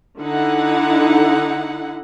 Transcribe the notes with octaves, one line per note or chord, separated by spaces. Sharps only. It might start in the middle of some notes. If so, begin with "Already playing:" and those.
D3 D#4 E4 F#5